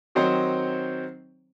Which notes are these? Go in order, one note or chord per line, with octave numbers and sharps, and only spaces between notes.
D#3 F#3 C4 D#4 C5 C#5